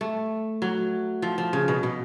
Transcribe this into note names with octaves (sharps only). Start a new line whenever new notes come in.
A3
F#3
F3
F3
C#3
B2
B2